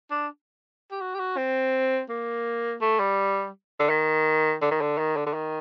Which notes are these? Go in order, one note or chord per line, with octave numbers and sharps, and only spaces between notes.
D4
G4
F#4
G4
F#4
C4
A#3
A3
G3
D3
D#3
D3
D#3
D3
D#3
D3
D3
D#3